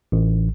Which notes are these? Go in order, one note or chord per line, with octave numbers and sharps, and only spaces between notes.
A1